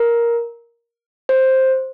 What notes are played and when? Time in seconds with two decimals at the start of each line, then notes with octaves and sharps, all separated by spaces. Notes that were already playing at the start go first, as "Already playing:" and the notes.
Already playing: A#4
1.29 C5